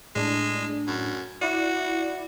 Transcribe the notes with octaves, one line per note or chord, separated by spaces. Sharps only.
A2 G#3 D4
F#2
E4 F#4 D5